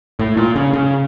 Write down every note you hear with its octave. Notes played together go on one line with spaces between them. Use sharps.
A2
A#2
C#3
C#3